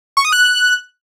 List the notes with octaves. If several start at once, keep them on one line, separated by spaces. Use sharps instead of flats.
C#6
D#6
F#6